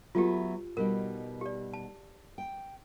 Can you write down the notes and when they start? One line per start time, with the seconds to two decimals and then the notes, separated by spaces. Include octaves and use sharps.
0.15 F#3 A3 B3 F4 G4
0.77 B2 G3 D#4 A#4
1.41 G4 D5
1.73 A5
2.38 G5